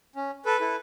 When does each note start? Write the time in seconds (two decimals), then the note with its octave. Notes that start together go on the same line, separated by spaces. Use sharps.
0.16 C#4
0.45 A4 B4
0.60 E4 A4